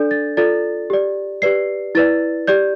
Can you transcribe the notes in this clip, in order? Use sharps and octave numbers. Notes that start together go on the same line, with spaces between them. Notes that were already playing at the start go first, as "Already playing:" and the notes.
Already playing: D4 A4 D5 G6
A6
F4 A4 D5 A6
G4 D5
G4 B4 D5 C7
E4 B4 D5 A6
G4 D5 G6